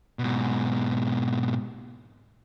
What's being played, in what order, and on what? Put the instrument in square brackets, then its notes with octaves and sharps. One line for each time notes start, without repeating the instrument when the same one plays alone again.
[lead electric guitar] G#2 B2